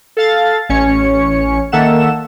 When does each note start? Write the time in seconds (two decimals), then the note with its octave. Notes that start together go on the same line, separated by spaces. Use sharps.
0.17 A4 F5 A6
0.69 A1 C#4 C#5 C#7
1.72 D#3 A#3 A4 E5 F#5 E7